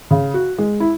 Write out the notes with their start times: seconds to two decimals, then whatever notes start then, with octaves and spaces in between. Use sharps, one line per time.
0.11 C#3
0.34 F#4
0.58 G#3
0.80 E4